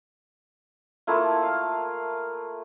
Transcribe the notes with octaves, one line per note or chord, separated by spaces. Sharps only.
A3 A#3 E4 F4
F5